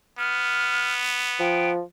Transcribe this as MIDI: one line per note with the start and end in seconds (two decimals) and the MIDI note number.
0.19 1.72 59
0.19 0.92 89
1.40 1.81 53
1.40 1.70 79